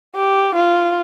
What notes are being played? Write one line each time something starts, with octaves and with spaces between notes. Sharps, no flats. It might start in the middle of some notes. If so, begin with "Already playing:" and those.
G4
F4